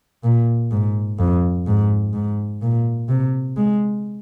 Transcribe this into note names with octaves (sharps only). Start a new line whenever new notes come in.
A#2
G#2
F2
G#2
G#2
A#2
C3
G#3